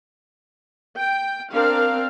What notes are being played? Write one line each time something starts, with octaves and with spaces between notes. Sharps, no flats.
G5
C4 D4 A#4 F5